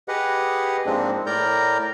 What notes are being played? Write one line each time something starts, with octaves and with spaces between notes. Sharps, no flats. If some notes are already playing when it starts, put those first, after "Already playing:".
G4 G#4 B4 D#5 F#5
G#2 F3 G#3 A#3 C4 D4
A2 A#4 D5 A#5 G6